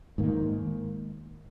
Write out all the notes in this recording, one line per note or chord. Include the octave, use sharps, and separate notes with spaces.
G#2 D#3 A#3